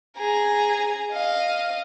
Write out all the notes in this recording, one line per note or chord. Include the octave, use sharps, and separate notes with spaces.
G#4 A#5
D#5 F5